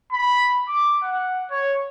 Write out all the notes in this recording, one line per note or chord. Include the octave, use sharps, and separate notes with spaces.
B5
D6
F#5
C#5